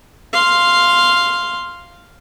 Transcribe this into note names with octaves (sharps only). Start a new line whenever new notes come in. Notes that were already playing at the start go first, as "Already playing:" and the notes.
F5 C6